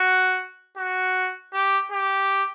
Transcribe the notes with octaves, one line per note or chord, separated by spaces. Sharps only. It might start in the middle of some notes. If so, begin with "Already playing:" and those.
Already playing: F#4
F#4
G4
G4